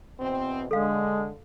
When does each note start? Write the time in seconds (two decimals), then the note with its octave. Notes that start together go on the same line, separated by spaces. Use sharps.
0.20 E2 B2 C4
0.71 D3 G#3 A4 F5